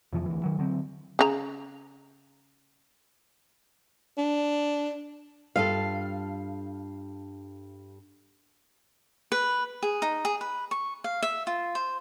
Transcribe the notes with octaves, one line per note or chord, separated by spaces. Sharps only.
F2 C3 E3 F3
D2 E3
D#3 F#3
D3 F#3 C4
C#3 D4 A#5
D4
G2 F4 A4 F5
B4
G#4
D#4
G#4
B4
C#6
F5
E5
F4
C5